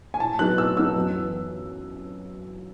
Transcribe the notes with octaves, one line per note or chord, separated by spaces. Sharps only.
G#5
A2 A5
F#3 B3 D#4 F#6
A2 E6
F#3 B3 D#4 E6
F#2
E3 B3